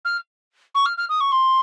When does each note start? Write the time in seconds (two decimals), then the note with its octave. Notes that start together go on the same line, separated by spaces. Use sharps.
0.05 F6
0.75 C#6
0.85 F6
0.97 F6
1.09 D#6
1.20 C#6
1.32 C6